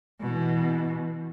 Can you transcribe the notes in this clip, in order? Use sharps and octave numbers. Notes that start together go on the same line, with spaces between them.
B2 E3